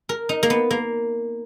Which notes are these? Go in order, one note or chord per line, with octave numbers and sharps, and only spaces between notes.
A#4
D#4
A#3
B3
A#3